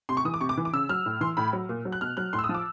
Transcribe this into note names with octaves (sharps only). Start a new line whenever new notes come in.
C3 C6
C#6
E3 D#6
D6
C3 C#6
D6
E3
D6
C#3 E6
F#3 F6
A2
E3 C6
A2 B5
F#3
A#2
F#3
F#6
B2 F6
F#3 F#6
A2 C6
E6
D#6
F3
D6